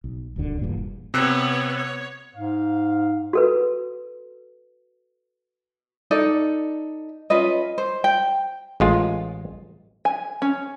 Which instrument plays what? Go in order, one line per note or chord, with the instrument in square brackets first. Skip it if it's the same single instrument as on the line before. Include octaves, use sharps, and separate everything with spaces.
[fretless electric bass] B1
D1 C2 F#2 D3
E1 E2 G2 A#2
[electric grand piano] C3 E6 F#6 [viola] B3 C#5
[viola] C#5
[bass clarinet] G#2 [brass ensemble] F5
[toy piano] F#4 A4 B4
[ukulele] D#4 A4 D5
C#4 F4 B4 D#5
C5
G5
[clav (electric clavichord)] A1 G#3 F4
[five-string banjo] G#5
C#4